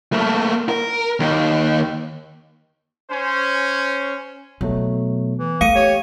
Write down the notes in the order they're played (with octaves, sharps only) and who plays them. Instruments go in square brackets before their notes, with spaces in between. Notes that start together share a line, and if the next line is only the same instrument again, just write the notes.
[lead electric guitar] A3 A#3
A#4
D#2 D#3
[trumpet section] C#4 C5
[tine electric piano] B2 F#3 A3 [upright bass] B3
[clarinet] E3
[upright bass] A3 [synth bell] F5 C#7 D#7 [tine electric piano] D#6
[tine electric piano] G4 [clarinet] C#5